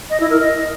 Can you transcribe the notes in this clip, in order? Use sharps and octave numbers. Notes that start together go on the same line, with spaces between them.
D#5
E4
A#4
D#5